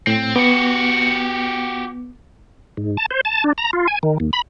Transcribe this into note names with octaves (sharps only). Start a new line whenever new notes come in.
A2 C4
B3 F#4 G4
G#2
A5
C5
A5
D4
A#5
F4
G#5
D#3
D#2
B5